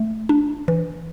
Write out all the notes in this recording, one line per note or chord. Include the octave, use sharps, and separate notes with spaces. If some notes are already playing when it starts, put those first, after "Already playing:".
Already playing: A3
D4
E3